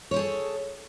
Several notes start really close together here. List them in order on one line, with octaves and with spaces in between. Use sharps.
C#5 C5 G#4 A4